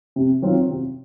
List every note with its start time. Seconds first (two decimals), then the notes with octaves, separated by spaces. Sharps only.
0.16 C3
0.42 D#3 F#3 C4 F4
0.69 C3